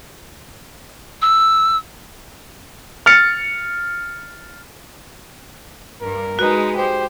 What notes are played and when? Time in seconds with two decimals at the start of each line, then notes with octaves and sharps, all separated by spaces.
1.22 E6
3.06 F6 A6 C#7
6.01 G2 A#4
6.39 G#3 D#4 F#4 B4
6.77 G4 C5